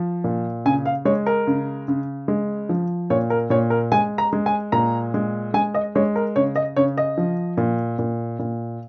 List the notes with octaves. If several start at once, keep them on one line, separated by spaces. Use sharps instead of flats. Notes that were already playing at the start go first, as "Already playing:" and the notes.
Already playing: F3
A#2
C#3 G#5
F5
G#3 C#5
A#4
C#3
C#3
G#3
F3
A#2 C#5
A#4
A#2 C#5
A#4
G#3 G#5
A#5
G#3
G#5
A#2 A#5
G#3
G#3 G#5
D#5
G#3 C#5
A#4
C#3 C#5
D#5
C#3 C#5
D#5
F3
A#2
A#2
A#2